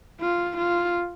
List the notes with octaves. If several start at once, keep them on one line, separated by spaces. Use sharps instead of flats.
F4
F4